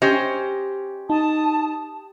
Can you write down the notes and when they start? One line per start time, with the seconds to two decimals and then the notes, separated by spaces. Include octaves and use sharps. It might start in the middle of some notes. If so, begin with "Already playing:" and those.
0.02 C#4 G4 C5 D#5
1.10 D#4 A5 D#6